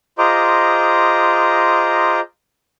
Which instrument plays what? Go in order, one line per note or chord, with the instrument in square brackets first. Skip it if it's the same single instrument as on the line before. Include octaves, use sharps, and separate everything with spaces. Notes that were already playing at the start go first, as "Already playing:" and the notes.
[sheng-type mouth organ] F4 G#4 C5 D#5 A#5 D6